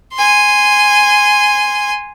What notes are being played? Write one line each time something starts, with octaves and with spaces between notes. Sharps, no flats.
G#5 C6